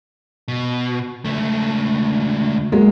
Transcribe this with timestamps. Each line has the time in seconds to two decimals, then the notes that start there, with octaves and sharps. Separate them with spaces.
0.48 B2
1.25 C#2 A3
2.72 F#3 G#3 A#3